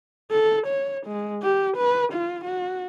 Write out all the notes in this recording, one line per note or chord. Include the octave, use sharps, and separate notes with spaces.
A4
C#5
G#3
G4
B4
F4
F#4